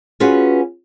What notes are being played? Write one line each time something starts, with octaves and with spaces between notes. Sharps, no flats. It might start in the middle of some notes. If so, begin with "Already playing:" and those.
C#4 F4 F#4 G#4 B4